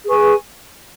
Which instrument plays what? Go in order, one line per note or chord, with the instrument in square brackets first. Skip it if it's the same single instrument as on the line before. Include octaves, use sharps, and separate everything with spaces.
[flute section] G#4 B4 G#5 C#6